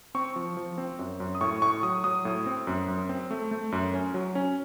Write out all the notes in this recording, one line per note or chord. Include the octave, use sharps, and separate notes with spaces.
C4 C#6
F3
F3
C4
F#2
F#2
D#6
A2 C#6
A2 C#6
F#3 D#6
F#3 D#6
A2
C4
F#2
F#2
C4
A3
A3
F#2
C#4
F#3
C#4